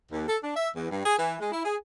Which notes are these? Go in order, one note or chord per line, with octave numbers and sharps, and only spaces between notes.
D#2
A4
D4
E5
E2
G2
G#4
E3
G#3
E4
G#4